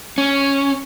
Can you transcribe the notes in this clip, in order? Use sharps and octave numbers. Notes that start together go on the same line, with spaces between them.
C#4